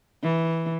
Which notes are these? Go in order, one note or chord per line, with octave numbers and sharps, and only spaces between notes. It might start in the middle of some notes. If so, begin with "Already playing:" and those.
E3